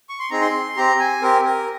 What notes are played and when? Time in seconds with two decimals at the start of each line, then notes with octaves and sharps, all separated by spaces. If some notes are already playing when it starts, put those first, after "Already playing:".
0.09 C#6
0.19 C6
0.30 C4 D#4 G#4 A#5
0.41 C6
0.77 C4 G4 A#5
0.99 G#5
1.22 C4 G4 A#4
1.45 A#4